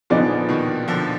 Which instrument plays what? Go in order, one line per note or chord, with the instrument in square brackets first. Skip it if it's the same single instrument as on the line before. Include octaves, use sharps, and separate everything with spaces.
[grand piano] A#2 D3 [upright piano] F3 B3 D#4 G#4 D5
[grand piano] B2 D#3
D3 F3